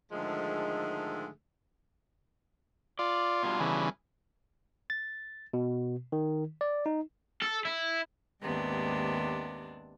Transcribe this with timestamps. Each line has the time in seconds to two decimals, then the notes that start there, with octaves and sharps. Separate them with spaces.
0.12 G#2 D3 D#3 F3 G#3 A3
2.99 F4 D5
3.43 B2 G3 D4
3.60 C#3 E3
4.90 A6
5.53 B2
6.12 D#3
6.61 D5
6.86 D#4
7.42 A4
7.65 E4
8.41 D#2 G#2 C3 B3 D4